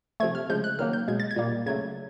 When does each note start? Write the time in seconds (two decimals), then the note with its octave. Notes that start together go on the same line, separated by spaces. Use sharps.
0.20 C3 F3 A3 G#6
0.35 F6
0.49 C#3 F3 G#3 G6
0.64 F#6
0.79 D#3 F#3 A#3 F6
0.93 G6
1.08 B2 G#3 G#6
1.20 A6
1.31 G#6
1.36 A#2 G3 A#3
1.66 C#3 F#3 A3 G#6